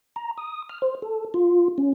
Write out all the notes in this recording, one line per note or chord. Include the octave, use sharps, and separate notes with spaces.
A#5
D#6
F6
C5
A4
F4
C#4